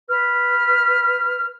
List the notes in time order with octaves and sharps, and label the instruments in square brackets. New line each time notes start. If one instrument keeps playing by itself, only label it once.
[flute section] B4 F6